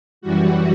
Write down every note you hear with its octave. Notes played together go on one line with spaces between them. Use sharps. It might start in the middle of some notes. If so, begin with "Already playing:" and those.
F#2 E3 G3 F#4